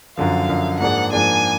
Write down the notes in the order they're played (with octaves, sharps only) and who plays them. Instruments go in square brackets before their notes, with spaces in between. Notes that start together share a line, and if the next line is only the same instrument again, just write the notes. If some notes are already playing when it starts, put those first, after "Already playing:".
[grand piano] F#2 D3 F3 [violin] F5
[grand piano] F#2 D3 F3
[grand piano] G#2 F3 A#3 D4 G#4 [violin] F#5
[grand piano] G#2 F3 A#3 D4 G#4 [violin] G#5